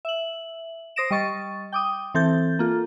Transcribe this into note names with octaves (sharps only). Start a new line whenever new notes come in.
E5 F#7
C5 D#6 A#6 D7 E7
G3 D#5 C#6 A6
G5 D6 D#6
E3 C4 A4 G6 A6
A#3 F4 A4